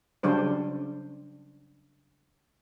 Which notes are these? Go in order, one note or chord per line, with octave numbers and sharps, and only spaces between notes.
C#3 F#3 G3 D4 C5